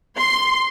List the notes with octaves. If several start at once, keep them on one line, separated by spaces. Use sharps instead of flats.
C6